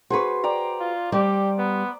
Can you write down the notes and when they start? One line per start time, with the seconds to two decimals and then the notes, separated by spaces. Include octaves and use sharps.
0.10 F#4 G#4 B4 C5 C#6
0.44 D5 G5 A#5
0.80 F4
1.12 G3 G4 C5 D5
1.58 B3